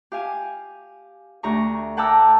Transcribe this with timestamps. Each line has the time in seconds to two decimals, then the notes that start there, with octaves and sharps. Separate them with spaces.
0.12 G4 F5 G#5
1.43 D2 G4 A#5 C#6
1.97 F#5 G5 A5 A#5 D6 E6